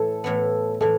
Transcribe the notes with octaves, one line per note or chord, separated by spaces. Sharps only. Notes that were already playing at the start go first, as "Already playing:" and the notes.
Already playing: A2 E3 A4
A2 E3 B3
A2 E3 A4